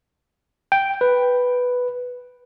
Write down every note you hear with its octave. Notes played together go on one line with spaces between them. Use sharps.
G5
B4